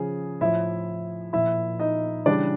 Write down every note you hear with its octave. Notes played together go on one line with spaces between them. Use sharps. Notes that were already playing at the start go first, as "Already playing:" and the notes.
Already playing: C#3 F3 G#4
A2 F3 E4 E5
A#2 F3 E4 E5
D#4 D#5
C#3 E3 G3 D4 D5